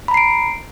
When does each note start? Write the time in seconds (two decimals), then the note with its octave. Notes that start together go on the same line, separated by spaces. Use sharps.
0.08 B5
0.11 A#5
0.14 C7
0.17 D7